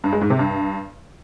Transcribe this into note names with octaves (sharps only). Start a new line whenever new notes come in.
G2
G#3
G#2
C3
G2